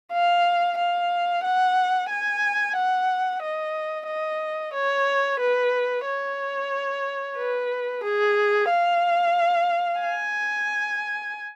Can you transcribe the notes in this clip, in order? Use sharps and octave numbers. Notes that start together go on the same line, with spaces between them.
F5
F5
F#5
G#5
F#5
D#5
D#5
C#5
B4
C#5
B4
G#4
F5
G#5